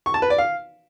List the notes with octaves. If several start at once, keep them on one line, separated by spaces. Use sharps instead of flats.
C#6
A5
B4
D5
F5